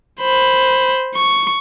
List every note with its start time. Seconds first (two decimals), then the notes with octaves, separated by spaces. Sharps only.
0.21 C5 B5
1.16 C#6